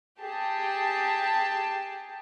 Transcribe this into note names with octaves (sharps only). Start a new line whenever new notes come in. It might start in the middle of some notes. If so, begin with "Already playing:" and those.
G4 G#4 A5